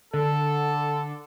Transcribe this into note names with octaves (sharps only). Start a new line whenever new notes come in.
D3 A4